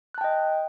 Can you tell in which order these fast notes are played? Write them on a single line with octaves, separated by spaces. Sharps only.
F#6 A5 G5 D#5